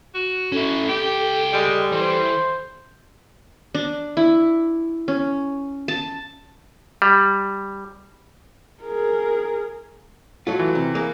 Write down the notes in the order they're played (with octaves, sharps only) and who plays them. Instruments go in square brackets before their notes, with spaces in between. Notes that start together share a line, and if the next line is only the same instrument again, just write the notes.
[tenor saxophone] F#4
[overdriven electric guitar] C#4 E4 [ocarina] A4
[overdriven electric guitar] C#2 G5 [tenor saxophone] G4
[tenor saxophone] G3 [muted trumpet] G#3
[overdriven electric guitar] E3 [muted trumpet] C5
[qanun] D4
E4
C#4
A5
[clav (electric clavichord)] G3
[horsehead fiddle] G#4 A#4
[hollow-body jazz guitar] F#3 A3 F4
[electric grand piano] E3
[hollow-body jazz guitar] C3
A#3 G#4